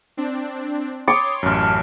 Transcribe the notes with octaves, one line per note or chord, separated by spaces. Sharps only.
C4 D4
C#5 C6 D6 D#6 A6 C#7
A1 F#2 A5 F6